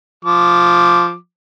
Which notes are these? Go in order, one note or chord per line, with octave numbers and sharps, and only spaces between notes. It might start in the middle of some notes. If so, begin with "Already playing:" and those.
F3 D6